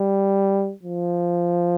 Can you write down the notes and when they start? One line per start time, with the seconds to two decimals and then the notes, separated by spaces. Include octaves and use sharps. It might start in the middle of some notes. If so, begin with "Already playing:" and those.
Already playing: G3
0.83 F3